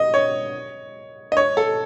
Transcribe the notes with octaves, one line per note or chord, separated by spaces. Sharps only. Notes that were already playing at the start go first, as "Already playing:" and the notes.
Already playing: D#5
C#5
D#5
C#5
A4